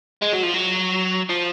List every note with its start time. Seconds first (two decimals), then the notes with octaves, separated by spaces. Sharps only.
0.22 G#3
0.33 F#3
0.43 F3
0.54 F#3
1.29 F3